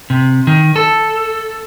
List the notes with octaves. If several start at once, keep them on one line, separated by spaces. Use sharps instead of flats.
C3
D#3
A4